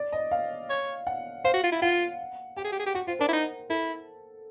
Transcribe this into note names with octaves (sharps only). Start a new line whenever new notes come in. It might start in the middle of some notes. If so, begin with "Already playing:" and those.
Already playing: D5
D#5
F5
C#5
F#5
C5 F5
F#4
F4
E4
F4 F#5
G4 G5
G#4
G4
G#4
G4
F#4 F#5
F4 C5
D4 A#4
E4
D#4
E4 A4